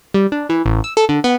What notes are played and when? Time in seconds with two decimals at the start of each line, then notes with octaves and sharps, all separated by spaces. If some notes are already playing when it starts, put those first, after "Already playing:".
0.14 G3
0.32 D4
0.49 E3
0.66 A1
0.84 E6
0.97 A4
1.09 D3
1.24 B3